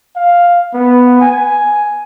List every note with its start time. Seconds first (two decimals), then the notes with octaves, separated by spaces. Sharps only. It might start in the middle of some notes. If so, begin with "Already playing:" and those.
0.16 F5
0.74 B3
1.21 G#5